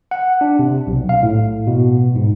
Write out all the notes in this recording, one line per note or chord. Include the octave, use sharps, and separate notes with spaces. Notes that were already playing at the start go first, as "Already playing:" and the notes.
F#5
D4
C3
B1
F5
A2
B2
G#2